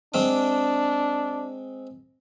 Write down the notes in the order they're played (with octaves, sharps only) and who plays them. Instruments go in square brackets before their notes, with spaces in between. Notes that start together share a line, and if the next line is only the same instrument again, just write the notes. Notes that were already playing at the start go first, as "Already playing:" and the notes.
[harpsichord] G#3 C4 D6 [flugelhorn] D4